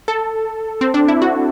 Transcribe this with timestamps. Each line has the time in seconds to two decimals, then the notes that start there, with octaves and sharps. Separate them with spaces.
0.08 A4
0.81 C4
0.94 D4
1.08 E4
1.22 F#4